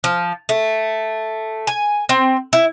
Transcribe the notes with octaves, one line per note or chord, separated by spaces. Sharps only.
F3
A3
G#5
C4
E4